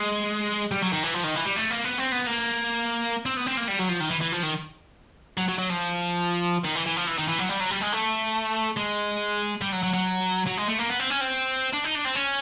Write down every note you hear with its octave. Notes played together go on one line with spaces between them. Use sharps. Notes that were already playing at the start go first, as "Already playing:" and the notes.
Already playing: G#3
G3
F#3
D#3
E3
F3
D#3
E3
G3
A3
A#3
B3
C4
B3
A#3
C4
B3
C4
A#3
G3
F#3
F3
D#3
E3
E3
F3
D#3
F#3
F#3
F#3
F3
D#3
E3
E3
F3
E3
D#3
E3
F#3
G3
F#3
G3
G#3
A3
G#3
G3
F#3
F#3
F#3
F#3
G#3
A3
A#3
B3
C4
C#4
C4
D4
D#4
D4
C4
C#4